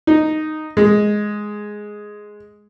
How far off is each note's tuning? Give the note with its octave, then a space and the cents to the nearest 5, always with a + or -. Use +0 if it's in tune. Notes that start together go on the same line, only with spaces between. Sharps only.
D#4 -5
G#3 +5